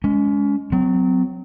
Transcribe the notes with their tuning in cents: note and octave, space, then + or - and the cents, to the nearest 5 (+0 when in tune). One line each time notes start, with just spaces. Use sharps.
G#3 +0 C#4 +30
F#3 +0 C4 -35